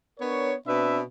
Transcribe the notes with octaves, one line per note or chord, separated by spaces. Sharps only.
B3 D4 A#4 C#5
B2 C4 D4 B4 E5 B5